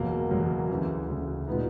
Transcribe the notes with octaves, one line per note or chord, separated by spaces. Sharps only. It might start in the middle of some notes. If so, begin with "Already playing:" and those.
Already playing: F#1 E2 B2 F#3 A#3
F#1 E2 B2 F#3 A#3
D2 C#3 E3
D2 C#3 E3
A#2 G3 B3 D#4